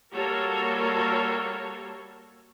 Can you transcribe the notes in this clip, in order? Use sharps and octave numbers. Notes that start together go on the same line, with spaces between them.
G3 A#3 F#4 A4 A#4 C#5